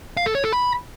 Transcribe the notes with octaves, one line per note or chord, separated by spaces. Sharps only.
F5
A4
C#5
A4
B5